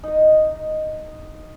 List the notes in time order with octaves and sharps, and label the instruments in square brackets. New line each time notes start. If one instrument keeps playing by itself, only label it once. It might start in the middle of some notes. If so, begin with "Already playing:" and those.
[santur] D#4 D#5